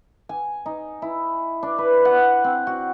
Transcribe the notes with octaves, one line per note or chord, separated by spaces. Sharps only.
G#5
D#4
E4
D4
B4
F#5
C4
F#4